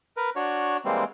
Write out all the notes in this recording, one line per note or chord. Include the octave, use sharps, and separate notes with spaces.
A#4 B4
D4 F#4 C#5
E3 G3 G#3 A#3 C4